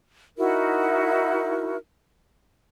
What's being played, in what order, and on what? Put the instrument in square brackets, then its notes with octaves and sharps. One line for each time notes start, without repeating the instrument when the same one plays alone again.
[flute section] D#4 E4 F#4 A#4